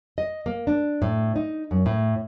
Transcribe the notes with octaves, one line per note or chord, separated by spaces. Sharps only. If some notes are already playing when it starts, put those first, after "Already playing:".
D#5
A#3
D4
A2
D#4
F#2
A2